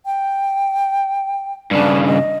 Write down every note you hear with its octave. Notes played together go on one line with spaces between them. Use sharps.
G5
G2 C#3 D4
D#5